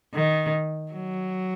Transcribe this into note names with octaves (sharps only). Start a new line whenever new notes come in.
D#3
F#3